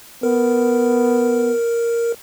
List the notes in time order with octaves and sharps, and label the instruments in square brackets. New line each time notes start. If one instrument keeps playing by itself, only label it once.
[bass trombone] B3 [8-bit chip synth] A#4